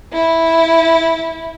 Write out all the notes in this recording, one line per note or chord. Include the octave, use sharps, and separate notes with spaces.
E4